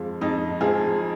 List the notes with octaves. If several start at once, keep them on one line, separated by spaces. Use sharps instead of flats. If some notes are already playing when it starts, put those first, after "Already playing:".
Already playing: F2 F3 G#3
F2 D#4
F3 G#3 G#4